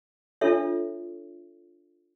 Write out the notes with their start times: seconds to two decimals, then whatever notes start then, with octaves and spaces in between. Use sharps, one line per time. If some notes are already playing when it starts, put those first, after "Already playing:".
0.41 D4 F4 A4 C#5 E5